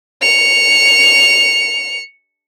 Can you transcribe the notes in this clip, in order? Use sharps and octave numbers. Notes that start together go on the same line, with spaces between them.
C#7 F7